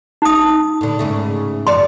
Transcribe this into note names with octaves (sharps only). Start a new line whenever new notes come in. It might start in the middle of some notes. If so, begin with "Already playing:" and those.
D#4 D#6
A2 D3
G#2 C#3 A3
F#2 F3 D5 C6